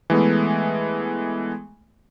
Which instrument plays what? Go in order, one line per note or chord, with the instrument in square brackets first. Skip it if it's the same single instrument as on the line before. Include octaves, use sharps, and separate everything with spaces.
[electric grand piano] E3 G#3 A3 B3